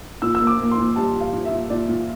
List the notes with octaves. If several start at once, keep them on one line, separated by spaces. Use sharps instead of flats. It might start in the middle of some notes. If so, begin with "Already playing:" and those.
A#2 E6
E6
A#3
D6
A#3
C6
A#2
G3 A5
G3
F5
A#2
E5
A#2
A#2 D5
A#2